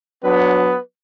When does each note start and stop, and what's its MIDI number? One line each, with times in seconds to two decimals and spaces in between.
0.24 0.74 54
0.24 0.78 59
0.24 0.74 62
0.24 0.79 71